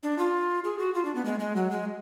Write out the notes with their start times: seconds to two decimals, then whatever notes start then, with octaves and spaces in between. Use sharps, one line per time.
0.03 D4
0.19 F4
0.64 G#4
0.79 F#4
0.95 F4
1.05 D4
1.15 B3
1.25 G#3
1.40 G#3
1.56 F#3
1.71 G#3